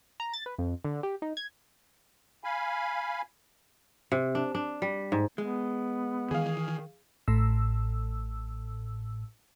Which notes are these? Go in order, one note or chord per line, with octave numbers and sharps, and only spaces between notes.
A#5
A6
B4
F2
D3
G4
D#4
G#6
F5 G#5 B5
C3
D4
D4
G3
G#2
G#3 B3
D#3 E3 G#4 F5
A1 A2 E6